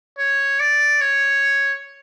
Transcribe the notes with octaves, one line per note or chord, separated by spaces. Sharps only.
C#5
D5
C#5